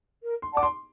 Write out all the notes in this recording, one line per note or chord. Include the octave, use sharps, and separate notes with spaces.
A#4
C6
D5 F#5 A5 D6
C6